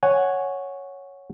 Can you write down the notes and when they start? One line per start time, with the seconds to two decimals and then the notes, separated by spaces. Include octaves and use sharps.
0.03 C#5 F#5 G#5